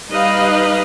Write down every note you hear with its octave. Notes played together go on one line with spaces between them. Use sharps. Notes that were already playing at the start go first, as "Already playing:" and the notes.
G3 D#4 B4 D#5 F5